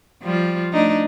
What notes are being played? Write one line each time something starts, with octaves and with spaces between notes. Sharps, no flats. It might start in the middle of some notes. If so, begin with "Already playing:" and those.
F3 G3 F4
A3 D4 D#4